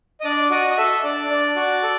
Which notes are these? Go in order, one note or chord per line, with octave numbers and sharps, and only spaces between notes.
D#5
D4 D5
F#4 D#5
D#5
A4 E5
D4 D5
D4
F#4
A4